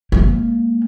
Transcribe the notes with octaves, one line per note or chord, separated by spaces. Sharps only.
G#3 A#3